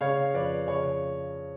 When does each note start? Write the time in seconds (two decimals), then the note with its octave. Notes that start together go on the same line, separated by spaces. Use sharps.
0.01 C#3 C#5 F5
0.34 F2 B4 D5
0.67 C#3 C#5